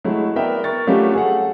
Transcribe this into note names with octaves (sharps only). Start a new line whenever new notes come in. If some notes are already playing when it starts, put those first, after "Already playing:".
F#3 G#3 A3 E4
B3 A#4 D5 E5 G5
A#4 C#6 A6
F#3 G3 A3 C#4 F4 G4
G#4 A4 F#5